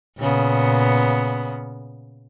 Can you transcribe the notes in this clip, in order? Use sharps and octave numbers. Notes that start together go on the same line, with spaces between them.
A#2 C#3 B3